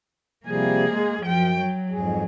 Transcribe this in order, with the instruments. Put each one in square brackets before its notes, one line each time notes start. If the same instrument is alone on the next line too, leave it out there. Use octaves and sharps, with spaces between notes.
[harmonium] C3 F3 G3 [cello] A#3 G#4
[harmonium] G#3
[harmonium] F#2 [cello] F3 G5
[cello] F#3
[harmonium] F2 G#2 G#4